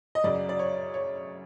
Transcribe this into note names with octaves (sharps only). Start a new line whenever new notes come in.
D#5
F#2 C#3 F#3 D5
D5
C#5
C#5